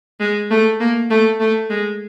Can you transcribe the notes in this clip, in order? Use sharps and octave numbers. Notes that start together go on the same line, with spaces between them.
G#3
A3
A#3
A3
A3
G#3